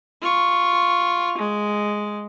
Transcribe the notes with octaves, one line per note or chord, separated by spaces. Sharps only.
F4 C#6
G#3